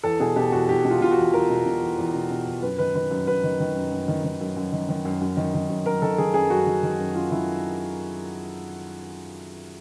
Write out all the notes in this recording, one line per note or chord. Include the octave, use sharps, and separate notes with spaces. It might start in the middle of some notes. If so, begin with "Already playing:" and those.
E2 A4
B2 G#4
B2 G4
E2 F#4
E2 G4
B2
F4
B2 F4
F#4
E2
E2 A#4
B2
B2
E2
E2
B2
B2
E2
F#2 B4
D#3 B4
D#3 B4
F#2
F#2 B4
D#3
D#3
F#2
F#2
D#3
D#3
F#2
F#2
D#3
D#3
F#2
F#2
D#3
D#3
F#2
F#2 A#4
D#3 A4
D#3 G#4
F#2 G#4
F#2 F#4
D#3
D#3
F#2
F#2 F4
D#3 E4